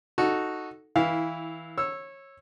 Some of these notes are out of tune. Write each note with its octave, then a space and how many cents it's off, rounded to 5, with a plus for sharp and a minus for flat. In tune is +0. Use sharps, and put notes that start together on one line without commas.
D#4 +0 F#4 +0 A4 +0
E3 -25 E4 -5 F5 -5
C#5 -20 E6 +0